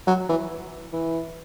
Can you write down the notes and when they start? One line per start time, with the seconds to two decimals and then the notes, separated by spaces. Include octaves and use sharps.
0.07 F#3
0.29 E3
0.92 E3